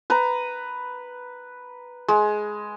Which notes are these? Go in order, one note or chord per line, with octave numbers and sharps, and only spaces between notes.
B4 A#5
G#3